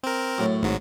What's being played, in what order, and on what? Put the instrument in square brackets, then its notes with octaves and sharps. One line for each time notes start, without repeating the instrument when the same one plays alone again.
[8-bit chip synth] C4 A#4
[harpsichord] F#2 A2
[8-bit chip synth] G#1 G#2 F#3